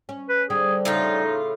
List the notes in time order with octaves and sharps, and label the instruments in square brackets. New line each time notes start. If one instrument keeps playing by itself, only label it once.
[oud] C#4
[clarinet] B4
[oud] D3 G3 C4 [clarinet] G#4
[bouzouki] A2 C#3 F4 [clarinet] D#4